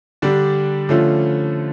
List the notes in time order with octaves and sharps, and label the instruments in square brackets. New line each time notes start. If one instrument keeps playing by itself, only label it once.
[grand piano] D3 G3 D4 G4
D3 F3 A3 C#4 F4